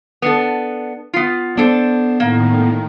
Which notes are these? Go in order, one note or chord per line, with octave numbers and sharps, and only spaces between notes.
B3 D4 A4
B3 F4
B3 D4 A4 C5
A2 D#3 A#3